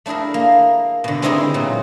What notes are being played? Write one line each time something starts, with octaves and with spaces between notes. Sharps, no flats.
A3 D4 E4 G#4 A#4
A#3
B2 D3
G#3 C4 D#4 E4 G4 G#4
A#2 F#3